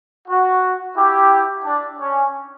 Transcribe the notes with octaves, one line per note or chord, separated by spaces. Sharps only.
F#4
E4 G4
D4
C#4